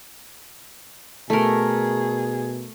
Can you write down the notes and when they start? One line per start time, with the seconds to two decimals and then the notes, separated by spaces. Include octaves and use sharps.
1.30 B2 A3 G#4 A#4